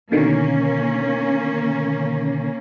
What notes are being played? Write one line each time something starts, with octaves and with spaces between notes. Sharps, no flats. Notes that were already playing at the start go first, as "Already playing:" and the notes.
B2 D3 D#3 A#3 C#4